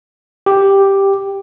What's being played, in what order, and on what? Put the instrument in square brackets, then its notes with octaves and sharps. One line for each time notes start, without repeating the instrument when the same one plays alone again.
[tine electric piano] G4